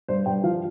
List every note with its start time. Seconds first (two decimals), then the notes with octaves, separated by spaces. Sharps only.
0.08 G2 C5
0.26 G2 G5
0.44 F3 F5